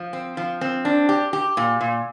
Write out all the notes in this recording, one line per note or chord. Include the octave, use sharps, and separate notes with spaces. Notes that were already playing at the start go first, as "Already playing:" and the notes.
Already playing: F3
C4
F3
C4
D4
G4
G4
A#2
A#2